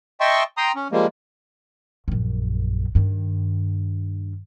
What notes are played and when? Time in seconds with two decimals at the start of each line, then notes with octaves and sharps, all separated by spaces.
0.21 D#5 E5 G5 A5 C6 C#6
0.58 G5 A#5 C6 D#6
0.76 C#4
0.92 F3 G3 G#3 A#3
2.08 A#1 F#2
2.95 G2 D#3